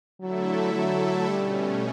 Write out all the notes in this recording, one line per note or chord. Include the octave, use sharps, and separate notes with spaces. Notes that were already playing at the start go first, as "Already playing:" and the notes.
D3 F#3 A3 E4 A4 E5
F#3
B2 G3 A3 C#4